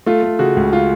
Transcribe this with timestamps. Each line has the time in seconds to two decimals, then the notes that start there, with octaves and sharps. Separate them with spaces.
0.06 A3 F4
0.23 A3
0.39 C#3 F#4
0.56 C#2
0.73 F4